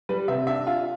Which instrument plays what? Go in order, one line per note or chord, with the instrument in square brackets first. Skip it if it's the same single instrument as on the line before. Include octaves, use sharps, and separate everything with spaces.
[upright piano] G3 B4
C3 E5
D4 E5
F4